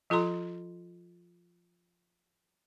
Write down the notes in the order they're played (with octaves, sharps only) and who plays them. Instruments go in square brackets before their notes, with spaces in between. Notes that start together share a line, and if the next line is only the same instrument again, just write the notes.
[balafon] F3 F4 A4 A#5 C6